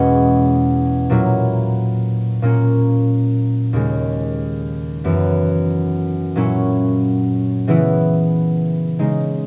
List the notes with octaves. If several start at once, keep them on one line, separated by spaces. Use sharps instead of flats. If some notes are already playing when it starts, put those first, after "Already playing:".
Already playing: E2 B2 G#3 C#4 E4
A#2 F#3 A#3 E4
A#2 A#3 C#4
D#2 C#3 G#3
F#2 E3 B3 E4
A#2 F#3 C#4 E4
C#3 E3 B3 E4
C#3 G#3 D#4